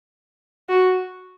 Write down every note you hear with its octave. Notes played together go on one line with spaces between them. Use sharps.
F#4